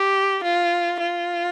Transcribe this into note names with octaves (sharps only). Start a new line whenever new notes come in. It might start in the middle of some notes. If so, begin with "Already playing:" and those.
Already playing: G4
F4
F4